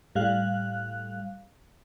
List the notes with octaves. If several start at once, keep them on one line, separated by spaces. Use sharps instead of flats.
A2 G3 F5 F#6